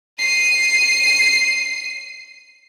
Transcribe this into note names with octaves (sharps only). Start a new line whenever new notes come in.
C7 D#7